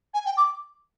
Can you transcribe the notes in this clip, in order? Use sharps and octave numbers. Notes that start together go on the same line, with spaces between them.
G#5
G5
D6